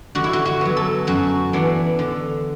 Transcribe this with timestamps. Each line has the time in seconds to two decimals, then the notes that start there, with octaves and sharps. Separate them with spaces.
0.15 D3 F#4
0.24 E4
0.33 F#4
0.45 F#4
0.61 F#3 B3
0.77 A4
1.07 F#2 F#4
1.53 E3 B3 D4
1.99 D3